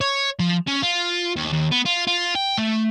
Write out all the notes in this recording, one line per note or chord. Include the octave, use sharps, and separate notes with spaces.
C#5
F3
C#4
F4
D#2
D#2
B3
F4
F4
G5
A3